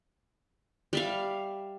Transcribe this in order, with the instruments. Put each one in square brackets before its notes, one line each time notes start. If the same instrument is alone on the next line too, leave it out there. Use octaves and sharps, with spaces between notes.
[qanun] G3 E5 F5